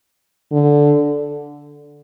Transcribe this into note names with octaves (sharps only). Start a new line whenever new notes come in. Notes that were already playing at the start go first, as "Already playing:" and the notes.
D3